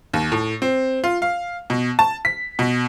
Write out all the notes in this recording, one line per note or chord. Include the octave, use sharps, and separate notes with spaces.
D#2
A2
C4
F4
F5
B2
A5
B6
B2